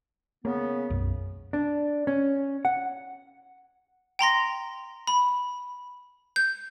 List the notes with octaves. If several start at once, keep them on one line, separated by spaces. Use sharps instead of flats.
C#3 A#3 B3
B1 F#2
D4
C#4
F#5
G5 A#5 C6 A#6
B5
G6